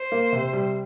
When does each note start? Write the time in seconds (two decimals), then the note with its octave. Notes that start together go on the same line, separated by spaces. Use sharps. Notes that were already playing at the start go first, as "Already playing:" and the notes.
Already playing: C5
0.12 A#3
0.33 C3
0.53 G3